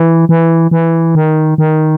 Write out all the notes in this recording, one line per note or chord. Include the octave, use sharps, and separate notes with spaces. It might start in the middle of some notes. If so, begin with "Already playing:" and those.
Already playing: E3
E3
E3
D#3
D#3